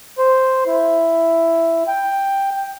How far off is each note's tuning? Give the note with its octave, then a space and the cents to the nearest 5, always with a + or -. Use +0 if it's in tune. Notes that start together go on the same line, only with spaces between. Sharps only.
C5 +0
E4 +5
G5 +5